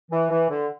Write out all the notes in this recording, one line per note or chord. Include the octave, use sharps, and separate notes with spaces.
E3
E3
D3